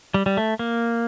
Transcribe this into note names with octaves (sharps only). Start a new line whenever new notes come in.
G3
G3
A3
A#3